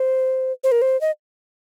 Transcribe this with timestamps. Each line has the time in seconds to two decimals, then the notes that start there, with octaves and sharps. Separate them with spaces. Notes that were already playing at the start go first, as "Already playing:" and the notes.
Already playing: C5
0.64 C5
0.72 A#4
0.82 C5
1.01 D#5